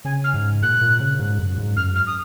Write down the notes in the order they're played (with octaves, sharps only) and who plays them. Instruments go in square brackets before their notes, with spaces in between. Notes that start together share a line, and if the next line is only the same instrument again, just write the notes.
[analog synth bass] C#3 [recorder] G#5
[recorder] F6
[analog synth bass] G#2
[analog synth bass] A#2 [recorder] F#6
[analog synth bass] A#2
C#3
G#2
F#2
G#2
[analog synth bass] F#2 [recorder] F6
[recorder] F6
D#6